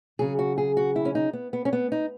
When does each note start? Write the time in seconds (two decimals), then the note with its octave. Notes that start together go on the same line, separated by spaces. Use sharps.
0.19 C#3 F#3 G#4
0.39 F#4
0.58 G#4
0.77 F#4
0.96 E4
1.05 C#4
1.15 D#4
1.33 B3
1.53 B3
1.65 C#4
1.73 B3
1.92 D#4